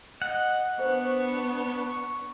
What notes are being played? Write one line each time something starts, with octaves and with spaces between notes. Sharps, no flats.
D#5 F#5
B3 D4 C5 C#6